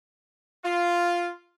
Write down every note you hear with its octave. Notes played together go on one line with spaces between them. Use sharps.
F4